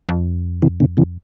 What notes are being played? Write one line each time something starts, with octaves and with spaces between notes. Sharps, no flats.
F2
C3 E3
B2 D3
C3 E3